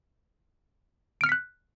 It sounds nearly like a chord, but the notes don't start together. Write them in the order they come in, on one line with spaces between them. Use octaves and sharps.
D7 F6 C#7 B6 F#6